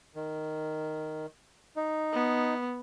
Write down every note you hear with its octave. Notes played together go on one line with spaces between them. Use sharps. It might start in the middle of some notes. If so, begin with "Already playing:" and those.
D#3
D#4
B3